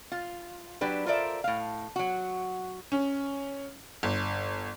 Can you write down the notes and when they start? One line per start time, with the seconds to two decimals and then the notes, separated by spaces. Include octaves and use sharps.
0.12 F4
0.81 F#3 D4 G4 B4
1.06 F4 A4 A#4 C5 D5 E5
1.44 A2 F5
1.96 F#3 F#4
2.92 C#4
4.03 G1